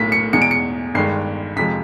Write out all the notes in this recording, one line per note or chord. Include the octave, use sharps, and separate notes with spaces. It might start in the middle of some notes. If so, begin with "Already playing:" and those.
Already playing: B1 A2 F#3 A#3 B6
C#7
E2 B2 G#3 C#7
D7
C#7
G1 G2 D#3 G#3 C7
F2 C3 F3 G#3 B6